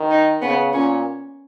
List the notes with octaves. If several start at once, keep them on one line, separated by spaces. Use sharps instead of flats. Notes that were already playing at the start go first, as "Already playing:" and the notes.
Already playing: D#3
D#4
C#3 B3
A#2 C#4